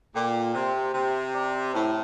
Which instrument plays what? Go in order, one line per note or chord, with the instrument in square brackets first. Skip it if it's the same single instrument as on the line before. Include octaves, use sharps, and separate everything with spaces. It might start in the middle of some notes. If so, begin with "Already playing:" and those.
[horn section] A#2 [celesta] A4 D5 G5 D6
[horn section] C3 [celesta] C5 G5 C6
[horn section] C3 [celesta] C5 G5 C6
[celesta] G4 D5 G5 A#5 D6
[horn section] A2 [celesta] C5 G5 A#5